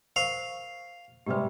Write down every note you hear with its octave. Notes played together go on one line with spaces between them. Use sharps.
A#4 C5 F5 C#6
G#2 C3 G3 G4 B4